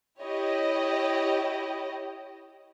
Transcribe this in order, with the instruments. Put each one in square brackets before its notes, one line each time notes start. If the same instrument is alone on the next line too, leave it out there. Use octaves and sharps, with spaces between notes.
[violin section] E4 G4 C#5 D#5